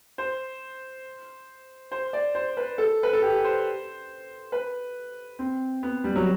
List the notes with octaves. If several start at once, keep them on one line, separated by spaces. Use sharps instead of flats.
C5
C5
D5
C5
B4
A4
B4
A4
G4
C5
B4
C4
B3
G3
F#3